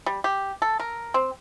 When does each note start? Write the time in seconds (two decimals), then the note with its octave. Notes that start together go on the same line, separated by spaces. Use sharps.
0.06 G3
0.24 G4
0.62 A4
0.80 A#4
1.14 C4